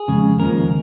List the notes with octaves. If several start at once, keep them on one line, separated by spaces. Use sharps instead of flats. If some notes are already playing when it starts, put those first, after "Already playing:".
Already playing: G#4
F2 C#3 G#3
D#2 C#3 F3 G#3 A#4